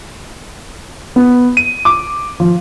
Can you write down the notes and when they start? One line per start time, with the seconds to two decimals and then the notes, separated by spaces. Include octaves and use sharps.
1.16 B3
1.57 D#7
1.85 D6
2.40 F3